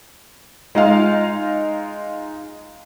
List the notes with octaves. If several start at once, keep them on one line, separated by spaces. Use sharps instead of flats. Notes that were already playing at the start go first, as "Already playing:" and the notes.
G#3 D#4 F4 F5